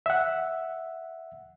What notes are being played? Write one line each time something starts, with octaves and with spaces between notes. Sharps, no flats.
E5 F#5